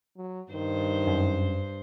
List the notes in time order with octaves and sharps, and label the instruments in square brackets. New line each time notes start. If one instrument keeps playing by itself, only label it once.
[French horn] F#3
[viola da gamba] G2 C5 [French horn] D#3
[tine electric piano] F#2